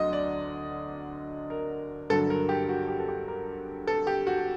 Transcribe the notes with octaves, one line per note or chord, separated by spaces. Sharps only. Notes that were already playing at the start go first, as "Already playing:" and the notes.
Already playing: D2 D3 F#3 D#5
D5
A#4
G2 D3 F#3 A4
A#4
G4
F#4
G4
A4
G4
A#4
A4
G4
F#4